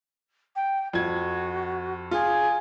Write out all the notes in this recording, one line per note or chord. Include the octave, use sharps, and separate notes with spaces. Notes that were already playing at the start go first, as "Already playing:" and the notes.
G5
F2 F#4 G#6
F4 G#4